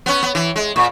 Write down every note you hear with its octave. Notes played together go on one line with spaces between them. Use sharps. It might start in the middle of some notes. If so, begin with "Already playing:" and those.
B3 C#4
B3
E3
G#3
A#2